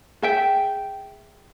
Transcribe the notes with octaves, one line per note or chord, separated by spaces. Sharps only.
G#4 E5 G5